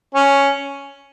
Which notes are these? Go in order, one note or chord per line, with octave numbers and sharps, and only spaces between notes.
C#4